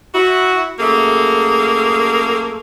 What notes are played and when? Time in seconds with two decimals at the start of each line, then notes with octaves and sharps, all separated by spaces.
0.15 E4 F#4
0.80 F#2 A3 A#3 G#4